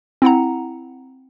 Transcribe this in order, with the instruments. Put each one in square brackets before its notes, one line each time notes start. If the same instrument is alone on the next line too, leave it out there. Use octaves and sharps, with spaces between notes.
[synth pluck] C4 E4 F#5 A#5